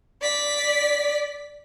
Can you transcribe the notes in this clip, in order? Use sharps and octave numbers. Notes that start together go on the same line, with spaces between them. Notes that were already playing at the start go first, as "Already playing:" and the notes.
D5 B6